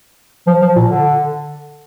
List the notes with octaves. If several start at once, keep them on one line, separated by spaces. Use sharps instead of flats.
F3
F3
A#2
D3